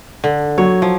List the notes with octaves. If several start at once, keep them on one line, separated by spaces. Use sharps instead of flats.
D3
F#3 C#5
F3